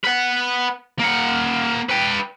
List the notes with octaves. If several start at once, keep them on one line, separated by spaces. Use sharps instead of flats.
B4 F#5
A#3 F#5
B4 G5